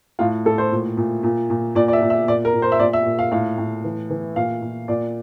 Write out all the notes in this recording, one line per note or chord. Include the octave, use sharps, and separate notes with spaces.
A2 F4
A2 A4
C5
A#2
A#2
A#2
A#2
A#2 D5
D5
E5
A#2
E5
A#2 D5
A#4
A#2
C5
E5
A#2 D5
E5
A#2
F5
A2 F5
A2
E3
E3
A#2 F5
A#2
A#2 D5